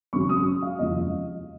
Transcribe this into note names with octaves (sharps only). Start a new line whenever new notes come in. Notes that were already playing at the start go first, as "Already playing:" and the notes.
G#1 F#2 C#3 F#3 C#4 C#6
D#6
F5
F1 D#2 C#3 F3 G#3 D#5